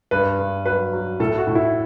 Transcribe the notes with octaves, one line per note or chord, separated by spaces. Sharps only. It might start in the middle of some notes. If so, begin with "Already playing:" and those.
G2 B4
G2
F#3 B4
F#3
A2 A4
F#4
A2
E4